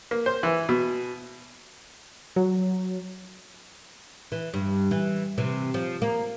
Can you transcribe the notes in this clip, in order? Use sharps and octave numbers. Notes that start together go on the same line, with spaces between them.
A#3
C5
E3
B2
F#3
E3
G2
E3
C3 E3
F3
A#3